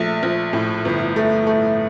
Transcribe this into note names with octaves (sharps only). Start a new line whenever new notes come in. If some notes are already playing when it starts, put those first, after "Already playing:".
Already playing: A#1 A3
A#1
A2
G1
A3
A3